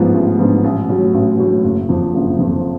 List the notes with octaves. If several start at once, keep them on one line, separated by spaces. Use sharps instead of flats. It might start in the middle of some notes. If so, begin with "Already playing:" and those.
Already playing: A1 G#2 F3 B3 F4
A1
G#2 F3 B3 F4
A1
A2 F#3
A1
A2 F#3
F#1
F2 F3
F#1
F2 F3